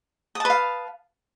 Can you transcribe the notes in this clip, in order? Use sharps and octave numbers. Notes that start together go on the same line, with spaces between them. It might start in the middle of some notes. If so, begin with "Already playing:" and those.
B4 F5 A5 D#6